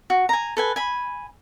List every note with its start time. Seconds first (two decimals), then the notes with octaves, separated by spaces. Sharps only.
0.10 F#4
0.29 G#5 A#5
0.57 A4 B4 G#5
0.76 G#5 B5